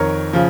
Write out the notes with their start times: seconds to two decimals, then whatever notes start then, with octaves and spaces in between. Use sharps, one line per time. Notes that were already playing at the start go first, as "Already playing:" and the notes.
Already playing: F2 D#3 A#4 C#5
0.33 C#3 F3